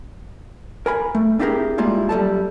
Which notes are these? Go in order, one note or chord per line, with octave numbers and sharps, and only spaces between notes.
A#4 G#5 B5
A3
C4 D4 E4 G4 G#4 A#4
G3 G#3 A#3 E4 F4
F#2 G3 A4 A5